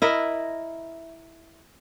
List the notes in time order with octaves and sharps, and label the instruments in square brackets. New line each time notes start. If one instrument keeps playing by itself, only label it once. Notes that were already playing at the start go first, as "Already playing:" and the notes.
[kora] E4 A#4 D#5 E5